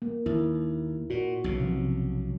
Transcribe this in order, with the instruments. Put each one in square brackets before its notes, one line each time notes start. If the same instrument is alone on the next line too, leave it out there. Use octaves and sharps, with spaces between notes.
[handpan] A#3
[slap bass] D#2 [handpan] E4
[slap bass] A#2 [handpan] F#4
[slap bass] B1 C#3
[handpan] C3 F3